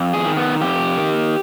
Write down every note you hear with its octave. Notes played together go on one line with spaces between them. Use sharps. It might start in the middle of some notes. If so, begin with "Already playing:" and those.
Already playing: F2
G#4
D#3
B3
F2 G4
D#3